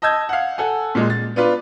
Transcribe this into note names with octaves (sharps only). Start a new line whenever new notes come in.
D#5 A5 E6 G6 G#6
F5 F#5
A4 F#5 G#5
A#2 G#3
A6
B3 D4 F4 B4